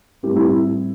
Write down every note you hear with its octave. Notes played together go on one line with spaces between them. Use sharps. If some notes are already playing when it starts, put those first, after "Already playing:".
A2 G3 C4 E4 G4
E4 G4